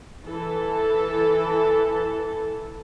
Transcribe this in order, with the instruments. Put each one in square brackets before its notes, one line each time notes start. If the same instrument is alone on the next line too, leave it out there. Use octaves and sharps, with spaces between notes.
[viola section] E3 A4 A5